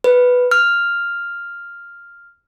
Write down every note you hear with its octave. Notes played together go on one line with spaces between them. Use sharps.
B4
F6